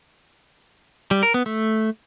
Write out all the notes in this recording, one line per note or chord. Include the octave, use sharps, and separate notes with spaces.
G3
A#4
B3
A3